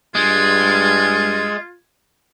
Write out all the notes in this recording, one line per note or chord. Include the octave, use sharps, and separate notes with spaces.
G2 G#3 F4 G#6